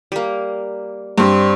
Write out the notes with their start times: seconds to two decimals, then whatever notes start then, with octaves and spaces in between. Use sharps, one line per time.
0.12 G3 A#3
1.18 G2 G3 C4